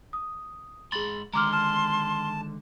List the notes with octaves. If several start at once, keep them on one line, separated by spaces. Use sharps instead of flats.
D#6
G#2 G#4 B5 C6 A6
D3 D#3 G#3 A#5 C6 D6 F6
A5 F6